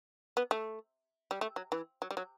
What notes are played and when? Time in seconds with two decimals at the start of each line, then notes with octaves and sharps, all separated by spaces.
0.37 B3
0.51 A3
1.31 G3
1.41 A3
1.56 F#3
1.72 E3
2.02 F#3
2.11 G3
2.17 F#3